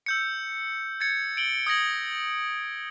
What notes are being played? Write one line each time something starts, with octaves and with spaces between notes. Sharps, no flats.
E6 G6 C#7
G#6 A6 C#7
D7 F#7 G7
D#6 G#6 A#6 F#7